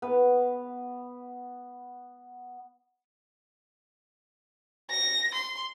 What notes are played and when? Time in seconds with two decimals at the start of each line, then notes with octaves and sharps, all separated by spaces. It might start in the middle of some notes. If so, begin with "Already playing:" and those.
0.02 B3 B4
4.91 A#6
5.35 C6